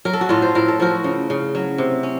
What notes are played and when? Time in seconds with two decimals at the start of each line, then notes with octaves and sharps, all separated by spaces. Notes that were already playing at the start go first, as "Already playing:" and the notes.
0.05 F#3 A#4
0.13 A4
0.21 F#4
0.29 A2 F4 A4
0.42 C5
0.55 A2 A#4
0.68 A4
0.80 F3 F#4 A#4
1.04 C#3
1.30 C#3
1.55 F#3
1.78 C3
2.03 C#4